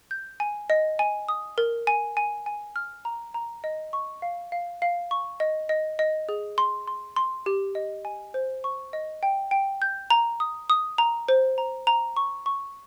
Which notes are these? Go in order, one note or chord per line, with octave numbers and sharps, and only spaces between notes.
G6
G#5
D#5
G#5
D#6
A#4
G#5
G#5
G#5
F6
A#5
A#5
D#5
C#6
F5
F5
F5
C#6
D#5
D#5
D#5
G#4
C6
C6
C6
G4
D#5
G#5
C5
C#6
D#5
G5
G5
G6
A#5
D#6
D#6
A#5
C5
A#5
A#5
C#6
C#6